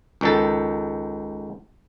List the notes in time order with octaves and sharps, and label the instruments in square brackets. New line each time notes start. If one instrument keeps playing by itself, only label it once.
[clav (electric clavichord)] C#2 D#3 A4